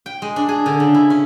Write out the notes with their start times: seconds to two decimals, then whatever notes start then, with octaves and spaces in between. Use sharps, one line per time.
0.06 G5
0.22 G#3
0.36 D4
0.49 G#4
0.66 D3
0.80 C#3
0.94 E4
1.10 C#4